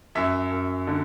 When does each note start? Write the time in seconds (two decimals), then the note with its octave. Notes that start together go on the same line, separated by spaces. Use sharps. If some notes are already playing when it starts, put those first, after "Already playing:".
0.15 F#2 E5
0.51 F#2
0.87 D3